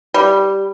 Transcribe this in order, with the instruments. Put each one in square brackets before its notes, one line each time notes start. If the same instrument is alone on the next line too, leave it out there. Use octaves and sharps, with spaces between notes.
[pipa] G3